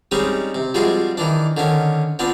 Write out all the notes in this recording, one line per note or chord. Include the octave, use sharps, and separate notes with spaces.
G3 G#3 C4 C#4 D#4
C3
F3 G3 G#3 C4 F#4 G#4
D#3 E3 D4
D3 D#3 C#4
B3 C4 D4 F4